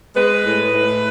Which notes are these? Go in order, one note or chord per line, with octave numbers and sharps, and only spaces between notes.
G#3 B4
A2
A2